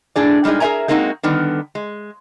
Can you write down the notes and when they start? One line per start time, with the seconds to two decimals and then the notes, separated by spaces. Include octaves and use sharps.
0.16 A2 D4 G#4 D5
0.44 A#2 G3 G#3 D#4 G#4
0.60 G#4 A#4 C5 E5 G#5 A#5
0.88 G#3 A#3 C4 D#4 E4 F#4
1.23 D3 D#3 G3 B3
1.75 G#3